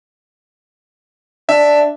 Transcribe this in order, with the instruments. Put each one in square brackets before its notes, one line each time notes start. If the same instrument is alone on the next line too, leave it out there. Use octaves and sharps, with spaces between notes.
[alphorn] D4 [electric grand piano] E5